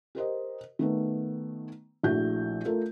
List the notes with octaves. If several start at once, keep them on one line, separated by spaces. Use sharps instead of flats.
G4 A#4 C5 D#5
D#3 A3 B3
A#1 A3 E4 F#4 G6
A3 F4 A4 A#4